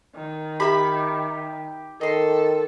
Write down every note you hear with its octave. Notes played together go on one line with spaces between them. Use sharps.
D#3
G4 E5 A#5 B5
D#3 A4 D#5 C6